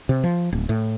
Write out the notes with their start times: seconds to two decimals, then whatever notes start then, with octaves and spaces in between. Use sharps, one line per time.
0.09 C3
0.24 F3
0.53 D1
0.69 A2